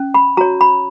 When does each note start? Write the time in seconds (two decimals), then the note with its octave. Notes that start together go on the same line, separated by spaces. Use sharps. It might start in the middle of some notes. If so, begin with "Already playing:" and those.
Already playing: C#4
0.14 B5
0.37 F#4 C#5 A#5
0.61 B5